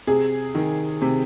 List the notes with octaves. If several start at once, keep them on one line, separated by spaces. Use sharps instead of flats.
C3 G#4
D#3
C3